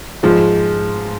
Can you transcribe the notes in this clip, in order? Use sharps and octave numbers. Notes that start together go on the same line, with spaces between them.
G#2 F3 G#3